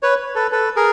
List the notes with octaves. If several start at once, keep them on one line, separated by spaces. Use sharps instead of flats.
B4 C#5
A4 B4
A4 B4
G#4 A#4